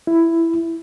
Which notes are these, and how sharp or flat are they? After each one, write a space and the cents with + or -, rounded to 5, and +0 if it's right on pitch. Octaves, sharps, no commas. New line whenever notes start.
E4 +10